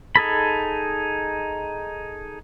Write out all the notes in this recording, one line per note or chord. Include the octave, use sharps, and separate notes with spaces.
D#4 G#4 A4 B5